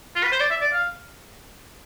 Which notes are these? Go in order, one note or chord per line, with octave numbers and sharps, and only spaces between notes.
F4
B4
C5
D5
E5
D5
F5